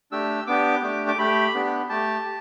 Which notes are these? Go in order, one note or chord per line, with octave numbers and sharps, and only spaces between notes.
A3 D4 G4 E6
B3 D4 G4 D6
A3 D4 G4
D6
A3 G4 B5
B3 D4 G4
A3 G4 A5
G4